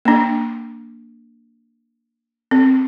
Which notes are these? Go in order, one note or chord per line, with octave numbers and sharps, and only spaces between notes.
A#3 D4
C4